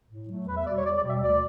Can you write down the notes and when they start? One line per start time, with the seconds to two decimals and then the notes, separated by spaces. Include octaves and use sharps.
0.09 A2
0.28 F#3 A3
0.46 E2 B4
0.56 E5
0.65 B2 G3 D5
0.76 C#5
0.84 E2 D5
0.96 D5
1.02 B2 G3
1.09 E5
1.21 D2 D5